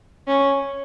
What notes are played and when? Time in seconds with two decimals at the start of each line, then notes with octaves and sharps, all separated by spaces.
0.27 C#4